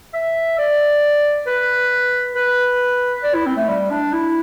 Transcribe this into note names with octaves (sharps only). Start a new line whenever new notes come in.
E5
D5
B4
B4
D5
E4
C4
A3
G3
D4
E4